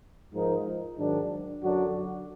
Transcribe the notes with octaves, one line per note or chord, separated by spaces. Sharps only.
G#2 F3 G#3 D#4 A#4
G#2 D#3 F#3 D4
F#2 D3 F#3 D4 F#4